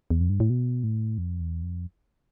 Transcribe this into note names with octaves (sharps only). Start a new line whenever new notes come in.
E2
F2
G2
A2
B2
A2
F2
E2
F2